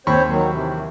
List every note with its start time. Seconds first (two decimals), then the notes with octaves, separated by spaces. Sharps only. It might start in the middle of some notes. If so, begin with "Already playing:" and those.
0.07 D#2 C4 C5 C#5 B5 C#6
0.29 D#3 F#3
0.51 C3 E3